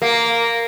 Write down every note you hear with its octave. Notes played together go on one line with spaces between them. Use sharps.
A#3